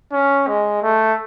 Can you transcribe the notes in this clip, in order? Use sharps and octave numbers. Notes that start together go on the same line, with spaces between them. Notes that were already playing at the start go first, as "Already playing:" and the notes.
C#4
G#3
A3